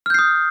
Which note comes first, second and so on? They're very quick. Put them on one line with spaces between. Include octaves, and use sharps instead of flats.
F6 G6 C7 D#6